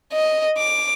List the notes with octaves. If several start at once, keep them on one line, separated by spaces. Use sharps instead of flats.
D#5
D6